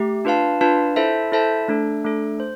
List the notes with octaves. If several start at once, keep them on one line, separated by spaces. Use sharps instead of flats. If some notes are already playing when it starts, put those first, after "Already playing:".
Already playing: A3 G4
D4 F4 B4 F5 A5
D4 F4 B4 F5 A5
E4 A4 C5 E5 A5
E4 A4 C5 E5 A5
A3 D4 A4
A3 D4 A4
C5